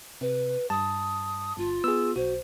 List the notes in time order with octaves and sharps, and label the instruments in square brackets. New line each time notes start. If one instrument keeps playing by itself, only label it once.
[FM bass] C3 [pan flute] B4
[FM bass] G2 [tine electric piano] A5 [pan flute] D#6
[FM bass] G1 [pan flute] F4
[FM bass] B3 [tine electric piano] G#4 E6
[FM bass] B1 [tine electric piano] F#4 [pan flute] C5